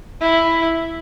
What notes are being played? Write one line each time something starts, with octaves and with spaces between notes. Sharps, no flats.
E4